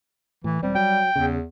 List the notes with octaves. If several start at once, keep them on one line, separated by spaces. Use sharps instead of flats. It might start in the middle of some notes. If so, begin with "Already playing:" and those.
A2 E3
E1 G3 C4
F#3 G5
E2 C#3